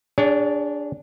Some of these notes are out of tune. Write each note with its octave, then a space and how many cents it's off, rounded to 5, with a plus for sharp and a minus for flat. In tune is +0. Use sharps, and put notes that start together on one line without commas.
D4 -10 G#4 -20 C#5 +30